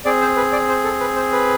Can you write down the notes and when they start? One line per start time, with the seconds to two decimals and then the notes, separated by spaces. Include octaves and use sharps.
0.05 C4 G#4 D5
0.21 C5
0.36 B4
0.52 D5
0.68 C5
0.84 A4
1.00 B4
1.16 C5
1.32 B4